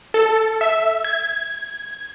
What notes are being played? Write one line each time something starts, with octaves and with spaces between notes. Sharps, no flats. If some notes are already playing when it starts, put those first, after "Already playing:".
A4
E5
G#6